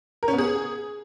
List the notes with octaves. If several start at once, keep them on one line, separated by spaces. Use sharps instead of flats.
A#4
C#4
B3
G#4